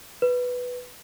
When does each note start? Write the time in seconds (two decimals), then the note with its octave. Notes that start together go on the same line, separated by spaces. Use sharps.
0.22 B4